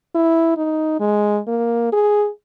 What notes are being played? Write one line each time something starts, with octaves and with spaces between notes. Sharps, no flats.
E4
D#4
G#3
A#3
G#4